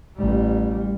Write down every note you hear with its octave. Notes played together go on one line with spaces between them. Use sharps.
A1 G3